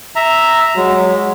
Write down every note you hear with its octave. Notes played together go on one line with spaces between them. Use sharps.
E5 A#5
F#3 G#3